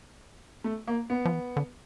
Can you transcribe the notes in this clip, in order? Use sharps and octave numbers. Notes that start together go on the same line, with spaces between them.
A3
A#3
B3
F3
E3
D3